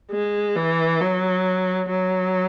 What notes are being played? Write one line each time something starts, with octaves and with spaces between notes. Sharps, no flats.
G#3
E3
F#3
F#3